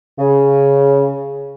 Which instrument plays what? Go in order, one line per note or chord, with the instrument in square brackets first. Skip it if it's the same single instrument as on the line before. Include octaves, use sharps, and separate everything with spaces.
[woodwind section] C#3